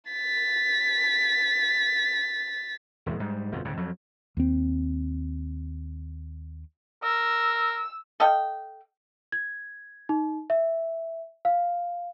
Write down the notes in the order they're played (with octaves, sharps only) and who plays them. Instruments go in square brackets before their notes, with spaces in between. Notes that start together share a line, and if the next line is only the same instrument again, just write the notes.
[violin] A6 B6
[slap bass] E1 E2 A2 G#3
G#2 G3
G1 F2 B2 F3
D2 A2 C#3
F2 F#3
[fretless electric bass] D#2 C4
[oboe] A#4 [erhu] E6
[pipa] A4 D#5 F5 G5
[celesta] G#6
D#4
E5
F5